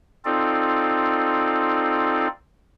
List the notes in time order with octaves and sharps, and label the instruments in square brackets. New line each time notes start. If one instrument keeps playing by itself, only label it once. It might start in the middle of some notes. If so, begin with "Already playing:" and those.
[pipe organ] C4 D#4 F4 A4 D5